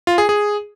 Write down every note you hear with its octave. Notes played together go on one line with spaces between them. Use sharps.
F4
G#4
G#4